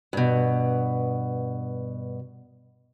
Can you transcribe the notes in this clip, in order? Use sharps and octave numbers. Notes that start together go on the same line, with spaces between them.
G2 B2